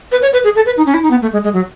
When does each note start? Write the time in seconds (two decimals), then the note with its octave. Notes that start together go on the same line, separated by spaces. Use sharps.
0.12 B4
0.22 C#5
0.33 B4
0.44 G#4
0.56 A4
0.66 B4
0.77 D#4
0.86 C#4
0.94 E4
1.03 D#4
1.11 B3
1.22 A3
1.33 G#3
1.44 G#3
1.53 F#3